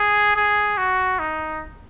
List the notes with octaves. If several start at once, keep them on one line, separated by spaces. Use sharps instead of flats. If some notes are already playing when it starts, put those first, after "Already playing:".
Already playing: G#4
G#4
F#4
D#4